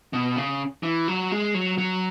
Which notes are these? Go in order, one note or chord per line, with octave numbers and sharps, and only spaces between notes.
B2
C#3
E3
F#3
G#3
F#3
F#3